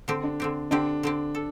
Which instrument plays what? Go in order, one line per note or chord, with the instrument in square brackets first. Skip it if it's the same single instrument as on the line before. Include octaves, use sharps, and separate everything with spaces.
[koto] D3 C4 G4
[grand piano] D4
[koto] D3 C4 G4
[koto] D3 C4 G4 [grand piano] D4
[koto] D3 C4 G4
A4